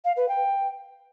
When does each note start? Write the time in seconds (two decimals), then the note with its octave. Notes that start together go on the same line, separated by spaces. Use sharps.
0.04 F5
0.16 B4
0.28 G5